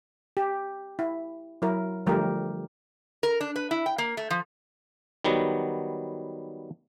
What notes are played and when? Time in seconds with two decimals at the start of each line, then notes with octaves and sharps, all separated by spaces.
0.37 G4
0.99 E4
1.62 F#3 E4 A#4
2.06 D3 F3 G3 A3 G4 A#4
3.23 A#4
3.41 D4
3.56 B4
3.71 E4
3.86 G5
3.98 A#3
4.17 A3
4.30 F3
5.24 D#3 F#3 G3 B3